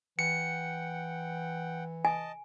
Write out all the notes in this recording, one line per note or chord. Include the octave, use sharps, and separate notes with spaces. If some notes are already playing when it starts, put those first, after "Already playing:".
E3 F#5 G5 C#7
D#5 G#5 A5